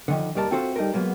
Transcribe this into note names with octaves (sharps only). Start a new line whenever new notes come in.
D3 D#3 F3
D#2 G3 A#4 F5 A5
C4 F4 F#4 A4 C5 E5
G3 D#4 A4 A#4
F#3 G#3 A#3 B3